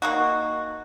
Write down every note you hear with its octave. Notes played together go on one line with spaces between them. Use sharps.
A#3 D#4 F#4